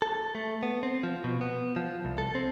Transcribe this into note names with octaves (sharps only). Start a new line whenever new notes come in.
A4
A3
B3
C4
F3
B2
B3
F3
C2
A4
C4